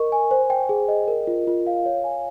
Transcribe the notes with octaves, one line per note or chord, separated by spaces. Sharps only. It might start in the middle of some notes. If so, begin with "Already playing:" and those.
Already playing: A#4 D#5 C#6
G#5
C5
G5
G#4
D#5
A#4
F4
F4
F5
C#5
G#5